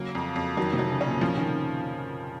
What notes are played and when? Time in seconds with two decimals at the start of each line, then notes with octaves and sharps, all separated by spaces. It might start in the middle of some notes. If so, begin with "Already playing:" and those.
Already playing: C#3 F#3 A#3
0.15 F2
0.36 F2
0.57 D#3 F#3
0.73 C3
0.79 F#3
0.90 C#3
1.01 A#2 C#4
1.21 C#3 F3
1.37 D#3